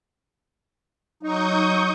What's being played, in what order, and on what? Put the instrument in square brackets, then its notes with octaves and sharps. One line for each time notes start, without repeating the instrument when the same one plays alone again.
[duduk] F#3 [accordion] D#4 [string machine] C#6 D#6 G6